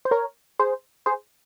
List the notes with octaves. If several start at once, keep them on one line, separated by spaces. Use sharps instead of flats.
C5
A#4 C#5
G#4 C5
G#4 C5